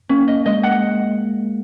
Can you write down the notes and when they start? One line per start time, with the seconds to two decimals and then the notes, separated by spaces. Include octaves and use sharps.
0.09 A#3 C#4
0.28 D#5
0.46 G#3 D#5
0.63 F#5